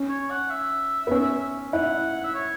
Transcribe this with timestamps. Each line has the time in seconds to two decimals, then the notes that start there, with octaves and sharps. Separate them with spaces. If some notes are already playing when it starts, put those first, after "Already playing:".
Already playing: C#4
0.09 C#5
0.30 F#5
0.50 E5
1.07 B3
1.11 C#4
1.73 E4 F#5
2.24 E5
2.35 C#5